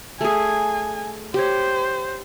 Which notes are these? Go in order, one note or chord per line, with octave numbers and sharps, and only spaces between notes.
A3 G#4 G#5
G4 C5 C#5